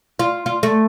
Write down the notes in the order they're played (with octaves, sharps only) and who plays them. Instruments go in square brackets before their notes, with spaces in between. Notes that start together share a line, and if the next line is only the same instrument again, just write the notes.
[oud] F4
F4
A3